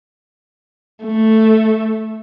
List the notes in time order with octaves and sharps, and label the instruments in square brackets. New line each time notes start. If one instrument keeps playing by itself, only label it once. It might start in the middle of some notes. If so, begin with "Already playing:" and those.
[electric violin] A3